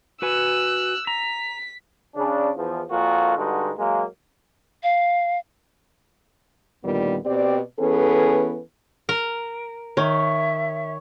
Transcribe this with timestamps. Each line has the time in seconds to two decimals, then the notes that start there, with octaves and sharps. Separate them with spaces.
0.22 F#4 B4 G#5 E6 F#6
1.07 A#5 B6
2.15 C#3 D4
2.56 E2 F3
2.90 F2 A#2 A#3 F4 F#4
3.37 G2 D3 G#3 D#4 F#4
3.78 F#3 G#3 A#3
4.83 F5
6.85 D2 A#2 D#3 G3 B3 F4
7.26 B2 C4 G4 D5
7.80 E3 B3 C#4 G#4 A4
9.09 A#4
9.97 D#3 C#5 E5